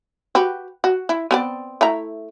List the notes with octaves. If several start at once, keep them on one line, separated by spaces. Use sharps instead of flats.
F#4 G4 B4
F#4
E4
B3 C4 D5
A3 E4 A#5